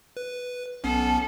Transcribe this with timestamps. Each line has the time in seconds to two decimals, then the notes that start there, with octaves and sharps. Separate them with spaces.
0.17 B4
0.84 B1 B3 C#4 A4